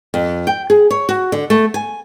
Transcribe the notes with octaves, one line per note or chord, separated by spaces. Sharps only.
F2
G5
G#4
C#5
F#4
D3
A3
G#5